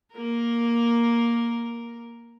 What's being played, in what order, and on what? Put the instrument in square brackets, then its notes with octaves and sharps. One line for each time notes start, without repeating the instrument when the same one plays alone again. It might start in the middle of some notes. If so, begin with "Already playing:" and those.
[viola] A#3 A#4